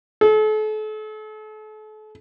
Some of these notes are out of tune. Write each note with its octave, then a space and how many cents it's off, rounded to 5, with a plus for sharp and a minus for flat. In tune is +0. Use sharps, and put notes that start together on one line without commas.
A4 -40